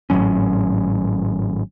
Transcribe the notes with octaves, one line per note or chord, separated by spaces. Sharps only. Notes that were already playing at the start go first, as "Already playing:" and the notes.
G#1 A2 F#3 C#4